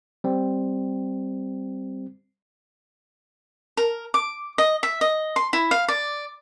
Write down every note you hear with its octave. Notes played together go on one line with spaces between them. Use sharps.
G3 C4
A#4
D6
D#5
E5
D#5
C6
E4
F5
D5